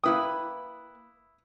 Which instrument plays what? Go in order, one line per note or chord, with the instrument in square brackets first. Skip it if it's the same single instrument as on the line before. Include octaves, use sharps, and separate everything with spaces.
[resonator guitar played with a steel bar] A#3 B4 G5 [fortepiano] E4 D#6